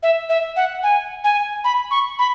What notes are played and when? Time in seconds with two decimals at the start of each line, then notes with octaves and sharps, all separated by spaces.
0.03 E5
0.29 E5
0.56 F#5
0.83 G#5
1.24 G#5
1.64 B5
1.91 C#6
2.19 B5